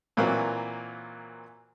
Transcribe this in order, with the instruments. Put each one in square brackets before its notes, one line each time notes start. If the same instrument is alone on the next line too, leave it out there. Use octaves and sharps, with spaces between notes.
[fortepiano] A#2 E3 F#3 A#3 C4